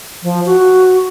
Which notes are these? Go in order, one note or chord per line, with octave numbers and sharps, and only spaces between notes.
F3
F#4